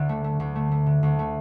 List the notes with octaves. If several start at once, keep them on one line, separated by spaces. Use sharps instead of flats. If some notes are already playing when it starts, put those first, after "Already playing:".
Already playing: D2 D3
A3
A3
D2
A3
A3
D3
D2
A3